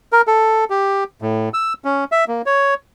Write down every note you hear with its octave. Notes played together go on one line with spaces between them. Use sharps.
A#4
A4
G4
A2
E6
C#4
E5
A#3
C#5